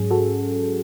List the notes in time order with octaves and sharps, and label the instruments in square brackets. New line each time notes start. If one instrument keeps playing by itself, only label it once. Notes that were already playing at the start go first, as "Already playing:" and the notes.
Already playing: [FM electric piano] G#2 F#3 C#4 G#4
F#4 A4